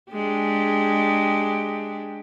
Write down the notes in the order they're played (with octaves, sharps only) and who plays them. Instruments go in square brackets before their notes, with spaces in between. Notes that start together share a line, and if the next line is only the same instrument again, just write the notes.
[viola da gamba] G#3 D4 G4